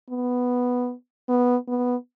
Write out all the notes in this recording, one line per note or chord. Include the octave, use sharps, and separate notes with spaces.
B3
B3
B3